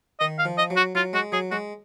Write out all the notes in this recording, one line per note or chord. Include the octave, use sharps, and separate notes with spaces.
D#3 D#5
F5
F3
D#5
F#3
F#4
F#3 F4
G#3 F#4
F#3 G#4
G#3 F#4